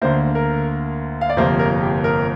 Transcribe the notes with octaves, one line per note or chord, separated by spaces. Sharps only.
D2 D3 A#3 C5
A#4
F5
D5
G1 F2 C3 A#3 C5
A#4
G4
A#4